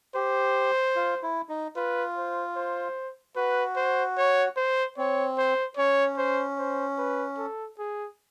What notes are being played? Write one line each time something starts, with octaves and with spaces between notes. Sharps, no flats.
G4 C5
F4
E4
D#4
F4 B4
C5
C5
F#4 B4
C5
C#5
C5
C4 C#5
C5
C#4 C#5
C5
C5
B4
A4
G#4